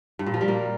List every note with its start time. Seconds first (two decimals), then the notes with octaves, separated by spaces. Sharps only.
0.19 G2
0.26 A#2
0.34 F3
0.41 G3
0.48 A#3